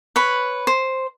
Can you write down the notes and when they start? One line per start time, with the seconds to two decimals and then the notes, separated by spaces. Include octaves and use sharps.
0.16 B4 C#5 B5
0.67 C5